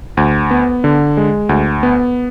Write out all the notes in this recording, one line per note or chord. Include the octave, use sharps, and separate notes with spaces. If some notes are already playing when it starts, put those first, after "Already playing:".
D2
B3
D3
G#3
D2
B3